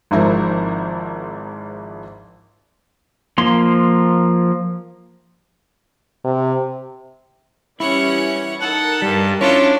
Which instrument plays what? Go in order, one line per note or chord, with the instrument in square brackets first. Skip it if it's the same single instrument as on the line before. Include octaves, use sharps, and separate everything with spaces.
[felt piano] G#1 G#2 F3 E4 A#4 C5
[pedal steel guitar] F3 A#3 C6
[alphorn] C3
[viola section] E3 G3 C#4 [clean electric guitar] E4 [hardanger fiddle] C#5 F#5
[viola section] D#4 A#4 A5 [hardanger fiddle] A4 [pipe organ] F#5
[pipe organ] G2 [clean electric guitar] G3
[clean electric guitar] C#4 E4 C#5 [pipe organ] D4 [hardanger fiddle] F4 A4